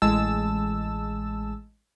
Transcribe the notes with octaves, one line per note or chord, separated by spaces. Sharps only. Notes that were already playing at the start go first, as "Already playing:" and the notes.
A1 G#3 A5 E6